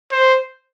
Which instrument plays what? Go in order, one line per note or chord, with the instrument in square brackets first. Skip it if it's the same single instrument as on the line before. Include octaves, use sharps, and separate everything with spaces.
[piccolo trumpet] C5